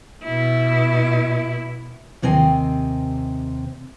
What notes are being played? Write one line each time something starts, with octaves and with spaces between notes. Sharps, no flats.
B2 E4
D#2 C3 C4 D#5 G#5